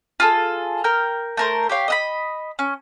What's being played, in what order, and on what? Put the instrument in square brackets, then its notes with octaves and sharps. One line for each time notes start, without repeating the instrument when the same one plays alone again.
[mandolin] F4 G#4 A4
A#4 G5 F6
A3 A#4 C5
G4 C#5 F5
D#5 E5 B5
C#4